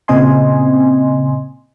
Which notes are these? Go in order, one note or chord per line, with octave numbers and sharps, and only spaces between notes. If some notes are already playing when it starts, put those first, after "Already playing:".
A#2 C#3 C4 D#5 G#5 C6